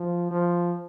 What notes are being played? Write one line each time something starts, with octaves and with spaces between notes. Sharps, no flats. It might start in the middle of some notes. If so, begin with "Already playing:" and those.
Already playing: F3
F3